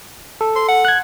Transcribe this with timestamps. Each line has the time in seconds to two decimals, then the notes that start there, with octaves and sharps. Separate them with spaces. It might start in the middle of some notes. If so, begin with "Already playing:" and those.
0.41 A4
0.56 C6
0.69 F#5
0.85 F#6 G#6